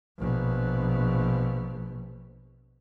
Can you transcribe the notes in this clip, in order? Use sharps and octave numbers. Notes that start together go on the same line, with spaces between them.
A#1 B2